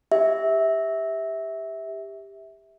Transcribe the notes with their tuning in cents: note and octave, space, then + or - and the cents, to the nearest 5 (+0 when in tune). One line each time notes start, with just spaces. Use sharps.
G4 +20 E5 -15